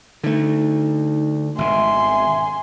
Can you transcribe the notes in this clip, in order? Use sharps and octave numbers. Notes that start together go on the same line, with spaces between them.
D3 A3 D#4
G#1 B2 E5 G#5 C6